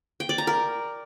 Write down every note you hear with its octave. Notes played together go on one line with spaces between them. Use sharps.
G5
D5
A#5
A#4